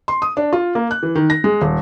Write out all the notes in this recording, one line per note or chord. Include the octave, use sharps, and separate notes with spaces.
C6
D#6
D4
F4
A#3
F#6
E3
D#3
A#6
G#3
D#1